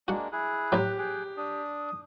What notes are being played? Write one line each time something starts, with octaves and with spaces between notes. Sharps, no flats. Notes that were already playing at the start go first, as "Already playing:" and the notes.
G#3 A#3 D4 F#4 F#5
E4 G#4 F#6
A1 A2 F#3 G4
G#4 G5 F#6
D4 D#6